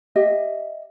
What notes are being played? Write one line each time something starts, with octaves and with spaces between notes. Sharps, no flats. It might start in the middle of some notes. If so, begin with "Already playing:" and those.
G4 D#5 E5